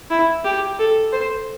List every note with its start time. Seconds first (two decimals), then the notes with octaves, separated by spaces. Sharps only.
0.10 E4
0.45 G4
0.79 A4
1.12 C5